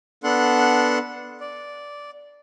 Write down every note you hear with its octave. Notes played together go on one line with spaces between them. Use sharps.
B3 D4 A4 F#5 C6 F#6
D5